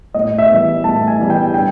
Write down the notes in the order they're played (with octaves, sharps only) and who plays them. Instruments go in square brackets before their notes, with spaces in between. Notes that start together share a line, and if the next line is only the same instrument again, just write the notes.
[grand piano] A2 [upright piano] D#5
[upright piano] E5
[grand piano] E3 G3 B3
[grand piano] A2 [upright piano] A5
[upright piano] G#5
[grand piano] E3 G3 B3
[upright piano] G5
[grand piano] D3 [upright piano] G5